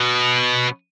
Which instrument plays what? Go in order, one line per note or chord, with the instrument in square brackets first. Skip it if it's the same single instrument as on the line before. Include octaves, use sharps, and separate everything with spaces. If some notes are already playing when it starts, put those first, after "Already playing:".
Already playing: [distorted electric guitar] B2